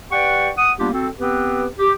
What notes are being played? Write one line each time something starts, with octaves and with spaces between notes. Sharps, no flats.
G4 B4 D5 F#5 G5 C#6
F#5 D#6
G3 A#3 B3 D4 F4 G4
C4 F#4 A4
B3 C4 G4 B4
G4